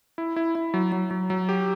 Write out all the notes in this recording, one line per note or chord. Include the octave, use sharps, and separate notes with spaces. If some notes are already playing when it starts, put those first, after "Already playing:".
E4
E4
E4
F#3
F#3
F#3
F#3
G4